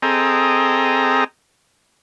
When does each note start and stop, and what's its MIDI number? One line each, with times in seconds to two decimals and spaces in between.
0.02 1.24 60
0.02 1.24 68
0.02 1.24 69
0.02 1.24 75
0.02 1.24 79
0.02 1.24 82